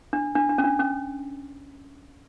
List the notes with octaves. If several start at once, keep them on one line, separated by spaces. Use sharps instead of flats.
D4
D4
D4
C#4
D4
C#4